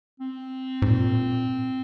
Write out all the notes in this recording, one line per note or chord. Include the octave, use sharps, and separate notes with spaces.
C4
G#2
A#2